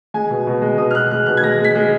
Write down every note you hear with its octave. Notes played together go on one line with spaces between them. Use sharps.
G#3 G#5
B2
B2
G#3
B2 D#6
F6
B2 F#6
G#3 F#6
B2 F#6
G#6
G#3 A#6
G#3
B6
G#3